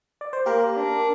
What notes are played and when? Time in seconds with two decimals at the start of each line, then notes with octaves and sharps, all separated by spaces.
0.21 D5
0.33 C5
0.46 A#3 G4 A#4
0.77 D4